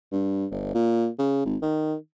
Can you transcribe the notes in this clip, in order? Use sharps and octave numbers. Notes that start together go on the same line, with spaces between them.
G2
G1
A#2
C#3
G#1
D#3